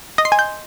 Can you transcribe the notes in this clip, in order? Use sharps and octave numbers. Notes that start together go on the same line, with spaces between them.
D#5
C6
G#5
G6